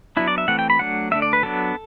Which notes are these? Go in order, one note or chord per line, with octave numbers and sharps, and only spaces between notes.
F#3 B3 D4 E4
D5
E5
E3 A3 C4 F#5
G5
B5
F#3 A3 D4 F#5
D3 A3 D4 E5
D5
B4
F#3 B3 D4 A4